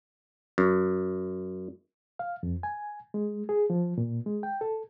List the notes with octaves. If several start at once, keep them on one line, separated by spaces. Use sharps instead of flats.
F#2
F5
F2
G#5
G#3
G#4
F3
A#2
G#3
G5
A4